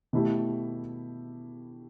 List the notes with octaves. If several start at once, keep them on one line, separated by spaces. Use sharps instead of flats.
B2 A3 E4 G4